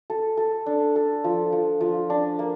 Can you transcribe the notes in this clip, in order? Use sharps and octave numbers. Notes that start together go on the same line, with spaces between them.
A4
A4
D4
A4
F3
F3
F3
D4
A#3